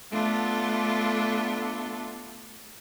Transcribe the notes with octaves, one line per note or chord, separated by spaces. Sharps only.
A3 B3 D4 F4 A4